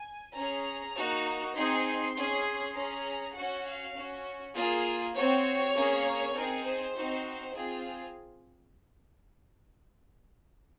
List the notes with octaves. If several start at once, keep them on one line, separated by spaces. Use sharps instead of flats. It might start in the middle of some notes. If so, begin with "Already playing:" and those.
Already playing: G#5
C#4 G#4 A#5
A#3 D#4 F#4
C4 D#4 G#4 C6
C#4 G#4
C#4 G#4 A#5
C#4 F#4 F#5
F5
C#4 F#4
A#3 F4 G#4
C4 F#4 C#5
A#3 C#4 G#4
C4 D#4 G#4 A#4
C5
C4 D#4 F#4
C4 F4 G#4